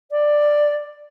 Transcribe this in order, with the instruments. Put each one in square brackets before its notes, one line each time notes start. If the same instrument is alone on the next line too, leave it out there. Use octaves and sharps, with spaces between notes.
[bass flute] D5